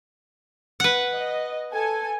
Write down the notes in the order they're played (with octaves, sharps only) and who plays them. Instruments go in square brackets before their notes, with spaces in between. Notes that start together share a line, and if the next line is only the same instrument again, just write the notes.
[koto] B4 F#5
[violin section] D#5
A4 G#5